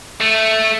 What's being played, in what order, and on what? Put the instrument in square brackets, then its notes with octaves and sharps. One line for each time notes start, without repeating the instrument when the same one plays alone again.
[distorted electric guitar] A3